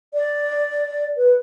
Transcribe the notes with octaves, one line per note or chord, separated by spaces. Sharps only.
D5
B4